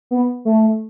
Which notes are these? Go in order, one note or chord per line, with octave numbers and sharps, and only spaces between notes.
B3
A3